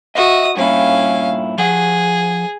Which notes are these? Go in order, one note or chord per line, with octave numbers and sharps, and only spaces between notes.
F#4 D#5 E5 D#6
G2 A#2 C#4 E4 F5
F3 G#4 F#5